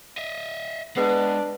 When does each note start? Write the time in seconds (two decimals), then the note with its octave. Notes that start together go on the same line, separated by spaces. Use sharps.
0.18 D#5 E5
0.97 G#3 B3 D4 G#4 B4 D#5